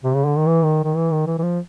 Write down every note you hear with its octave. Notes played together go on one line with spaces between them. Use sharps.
C3
C#3
D3
D#3
E3
D#3
D#3
E3
D#3
E3
E3
F3